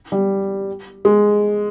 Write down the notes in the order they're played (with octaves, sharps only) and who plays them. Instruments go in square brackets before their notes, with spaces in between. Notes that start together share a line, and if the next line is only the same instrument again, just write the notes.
[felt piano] G3
G#3